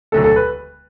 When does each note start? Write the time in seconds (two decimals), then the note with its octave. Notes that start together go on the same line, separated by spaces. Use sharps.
0.12 E1 D2 D3 F#3 A4
0.24 A4
0.36 B4